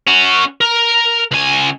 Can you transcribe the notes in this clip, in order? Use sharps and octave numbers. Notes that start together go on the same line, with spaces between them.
C#4 F#4
A#4
C#2 G#5